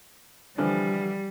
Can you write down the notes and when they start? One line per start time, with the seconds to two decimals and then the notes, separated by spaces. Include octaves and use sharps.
0.58 D3 E3 F3 G3